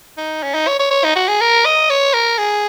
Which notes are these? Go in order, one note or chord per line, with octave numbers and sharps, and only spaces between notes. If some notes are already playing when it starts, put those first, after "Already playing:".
D#4
C#4
D#4
C#5
C#5
C#5
D#4
F#4
G#4
A#4
D#5
C#5
A#4
G#4